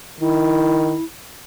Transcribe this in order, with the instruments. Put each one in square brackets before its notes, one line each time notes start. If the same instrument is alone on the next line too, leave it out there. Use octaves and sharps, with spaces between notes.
[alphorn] D#3 [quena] E4